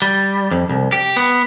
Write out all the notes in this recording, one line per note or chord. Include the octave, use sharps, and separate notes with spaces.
G3
F2
C2
G4
B3